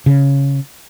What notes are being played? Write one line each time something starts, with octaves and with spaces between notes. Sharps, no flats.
C#3